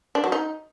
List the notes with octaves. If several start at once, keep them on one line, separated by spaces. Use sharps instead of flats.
D4
F#3
D#4